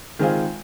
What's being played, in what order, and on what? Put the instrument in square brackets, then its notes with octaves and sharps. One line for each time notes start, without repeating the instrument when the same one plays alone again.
[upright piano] D#3 G#3 C4 F4 G#4